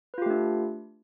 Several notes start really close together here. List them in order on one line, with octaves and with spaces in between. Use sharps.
B4 F4 G4 A3 D4